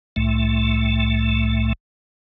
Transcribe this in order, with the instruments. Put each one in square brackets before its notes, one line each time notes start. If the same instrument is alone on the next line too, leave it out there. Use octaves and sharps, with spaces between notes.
[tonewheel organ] C2 A2 A3